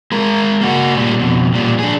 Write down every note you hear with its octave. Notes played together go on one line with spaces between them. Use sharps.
G#3 A#4
A#3 F#4
A#2 G3
F2 B2
A#2 G3
D4 G#4